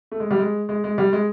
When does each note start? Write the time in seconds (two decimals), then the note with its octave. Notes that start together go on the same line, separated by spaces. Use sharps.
0.12 A3
0.20 G#3
0.31 G3
0.39 G#3
0.69 G#3
0.84 G#3
0.98 G3
1.13 G#3